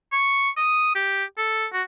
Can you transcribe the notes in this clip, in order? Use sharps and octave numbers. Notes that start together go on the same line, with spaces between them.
C#6
D#6
G4
A4
F#4